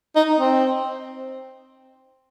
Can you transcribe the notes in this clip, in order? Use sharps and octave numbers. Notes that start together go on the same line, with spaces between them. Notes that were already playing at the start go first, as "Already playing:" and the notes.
D#4
C4